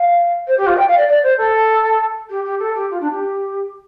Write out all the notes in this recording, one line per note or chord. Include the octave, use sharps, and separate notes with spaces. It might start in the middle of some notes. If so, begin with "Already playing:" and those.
Already playing: F5
C5
G4
F4
G5
F5
D5
D5
C5
A4
G4
G4
A4
G4
F4
D4
G4